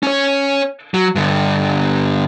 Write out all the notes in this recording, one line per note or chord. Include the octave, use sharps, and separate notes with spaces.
C#4 C#5
F#3
G2 D3